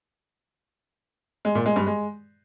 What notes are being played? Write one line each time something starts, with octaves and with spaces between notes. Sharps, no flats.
G#3
A#2
G#3
G2
G#3